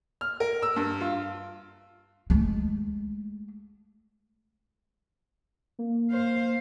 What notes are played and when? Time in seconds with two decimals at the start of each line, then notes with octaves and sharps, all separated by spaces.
0.21 F6
0.40 A#4
0.62 E6
0.76 G2
1.01 F4
2.30 G#3 A3
5.79 A#3
6.12 C5 F5